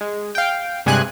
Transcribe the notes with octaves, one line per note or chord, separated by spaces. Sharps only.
G#3
F5 G5
C2 G2 C3 G#3 G#5 F#6